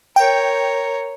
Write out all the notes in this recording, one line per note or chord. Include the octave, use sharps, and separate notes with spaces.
A#4 C#5 G5